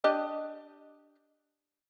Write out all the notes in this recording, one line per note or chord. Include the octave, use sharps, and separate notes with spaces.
D4 G4 D#5